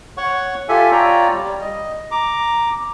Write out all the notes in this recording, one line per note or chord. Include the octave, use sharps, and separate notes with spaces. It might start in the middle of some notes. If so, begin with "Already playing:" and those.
C#5 F#5 C#6
F4 G4 A4 E5 G#5
F4 C#5 D5 G5 A#5
G3
D#5
A#5 D6